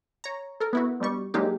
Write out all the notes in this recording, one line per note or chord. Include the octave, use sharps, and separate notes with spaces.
C#5 A#5
A4 A#4
B3 E4 F#4
G2 B2 G3 C#6
F#3 G#3 A#3 D4 D#4 G4